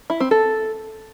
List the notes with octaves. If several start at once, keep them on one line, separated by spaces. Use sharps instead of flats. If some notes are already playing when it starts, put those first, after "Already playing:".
E4
C4
A4